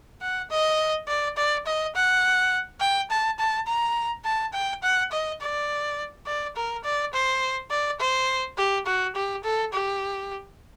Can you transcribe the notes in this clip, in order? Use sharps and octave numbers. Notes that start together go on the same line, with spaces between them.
F#5
D#5
D5
D5
D#5
F#5
G5
A5
A5
A#5
A5
G5
F#5
D#5
D5
D5
A#4
D5
C5
D5
C5
G4
F#4
G4
A4
G4